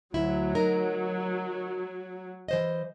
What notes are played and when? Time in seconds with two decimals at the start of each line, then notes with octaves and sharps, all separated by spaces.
0.14 D2 F#3 E4
0.55 D#4 A#4
2.48 E3 C5 D#5